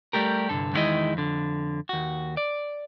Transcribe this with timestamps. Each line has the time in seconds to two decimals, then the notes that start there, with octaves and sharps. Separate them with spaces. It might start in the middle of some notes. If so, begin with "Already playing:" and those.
0.13 G3 A3 G4 A#4
0.49 C2 G2 D3 A4
0.73 E2 D#3 G3 G#3 E4 D#5
1.14 F2 D3
1.89 D#2 F#4
2.37 D5